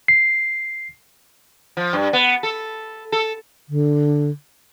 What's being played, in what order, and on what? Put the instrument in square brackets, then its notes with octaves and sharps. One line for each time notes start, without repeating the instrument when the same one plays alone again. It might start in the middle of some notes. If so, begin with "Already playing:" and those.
[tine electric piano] C7
[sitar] F3
G2
B3
A4
A4
[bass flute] D3